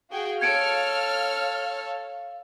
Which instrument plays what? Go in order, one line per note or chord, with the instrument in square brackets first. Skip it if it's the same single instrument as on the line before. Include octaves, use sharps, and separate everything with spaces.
[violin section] F#4 G#4 G5 [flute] F5
[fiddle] A4 C#5 [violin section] F6 [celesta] G#6 C#7 D7